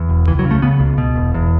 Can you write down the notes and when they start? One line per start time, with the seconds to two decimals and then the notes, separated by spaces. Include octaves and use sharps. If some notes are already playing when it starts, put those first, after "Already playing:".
Already playing: E2
0.09 E1
0.27 C#2 E3
0.39 F#3
0.45 C#3
0.51 A3
0.62 C#3 B3
0.80 C#2
0.98 B2
1.15 E1
1.34 E2